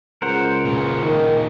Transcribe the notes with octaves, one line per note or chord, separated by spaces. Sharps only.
C#2 A#4 C5 F#5
A#2 C#3
D#3